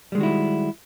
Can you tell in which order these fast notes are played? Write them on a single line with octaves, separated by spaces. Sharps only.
G3 G#3 D#3 F#4 E4